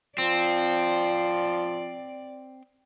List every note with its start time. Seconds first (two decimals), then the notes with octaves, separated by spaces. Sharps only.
0.18 F3 C4 D5